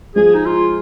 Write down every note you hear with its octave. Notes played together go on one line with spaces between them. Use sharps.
F3 G#3 G#4
D#4
F4